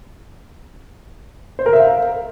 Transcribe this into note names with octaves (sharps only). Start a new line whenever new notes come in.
C5
A#4
E5
F5